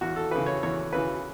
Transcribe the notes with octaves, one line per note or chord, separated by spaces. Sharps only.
E2 F#4
A4
C#3 E3 B4
C#5
E2 C#5
C#3 E3 B4